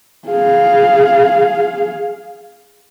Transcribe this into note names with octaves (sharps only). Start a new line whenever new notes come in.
G#4 F5